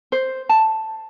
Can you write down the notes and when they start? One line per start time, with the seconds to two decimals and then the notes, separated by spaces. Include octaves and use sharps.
0.12 C5
0.49 A5